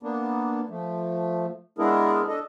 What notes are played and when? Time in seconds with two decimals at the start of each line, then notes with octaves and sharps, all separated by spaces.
0.03 A#3 B3 D4
0.69 F3 A3
1.78 G#3 B3 D4 E4 G#4 A#4
2.28 D4 A4 D#5